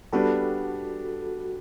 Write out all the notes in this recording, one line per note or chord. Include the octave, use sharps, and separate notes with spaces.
G3 B3 D4 F#4 G4 A4